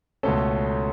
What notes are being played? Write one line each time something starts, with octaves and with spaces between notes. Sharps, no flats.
C#2 B2 A3 C#4 A4